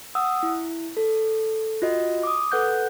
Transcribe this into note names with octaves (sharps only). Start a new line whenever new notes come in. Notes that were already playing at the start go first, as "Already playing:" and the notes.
F#5 D#6 E6
E4
A4
F4 F#4 D#5
D6 D#6
A4 B4 F#5 F#6 G6